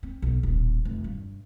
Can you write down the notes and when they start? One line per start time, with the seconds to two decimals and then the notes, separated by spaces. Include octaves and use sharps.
0.03 C4
0.22 B1
0.43 D#1
0.85 F1
1.04 G2